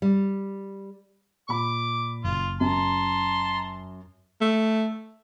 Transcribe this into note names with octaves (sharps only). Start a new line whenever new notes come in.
G3
A#2 B5 D6
F#1 F4
F#2 A5 A#5 C6
A3